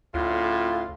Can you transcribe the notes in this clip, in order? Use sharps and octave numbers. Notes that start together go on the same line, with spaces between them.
D2 A2 F4